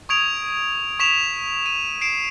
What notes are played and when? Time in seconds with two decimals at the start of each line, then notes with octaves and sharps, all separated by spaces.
0.09 C#6 D#6 G#6 D7 F7
0.99 C#6 B6 E7 F7
1.66 D#7
2.01 C7 D7 E7